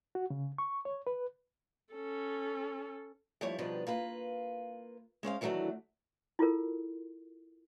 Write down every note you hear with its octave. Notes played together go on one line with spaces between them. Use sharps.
F#4
C#3
C#6
C#5
B4
C#4 A4
G2 F3 G3 E4 C#5
B2 D#3 F3 G3 D4 B4
A#3 F4 B4
G#3 C#4 C5 F5
D#3 E3 F#3 A3 D4 F#4
E4 F4 A4 A#4